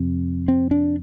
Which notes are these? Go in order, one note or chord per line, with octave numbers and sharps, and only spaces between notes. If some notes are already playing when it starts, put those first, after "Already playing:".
Already playing: F2 C3
C4
D4